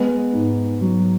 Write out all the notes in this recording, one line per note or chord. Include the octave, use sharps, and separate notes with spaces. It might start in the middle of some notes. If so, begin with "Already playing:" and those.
Already playing: G#3 B3
G#2
F#3